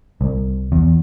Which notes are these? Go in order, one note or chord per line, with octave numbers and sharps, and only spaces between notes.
C2
E2